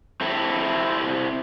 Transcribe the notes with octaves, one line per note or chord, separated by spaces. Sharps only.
C4 E4 A4